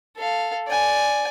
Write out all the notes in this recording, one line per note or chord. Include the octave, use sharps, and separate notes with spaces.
A4 F5
D5 G#5